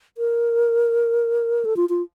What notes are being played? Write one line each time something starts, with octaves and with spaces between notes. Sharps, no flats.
A#4
A4
F4
F4